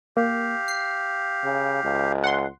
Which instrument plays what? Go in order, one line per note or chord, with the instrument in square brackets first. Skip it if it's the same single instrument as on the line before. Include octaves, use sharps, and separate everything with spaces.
[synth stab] A#3 [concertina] G4 F5
[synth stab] C7
[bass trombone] C#3
C#2
[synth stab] F#5 C6